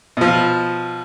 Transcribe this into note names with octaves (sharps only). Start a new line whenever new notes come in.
B2 F3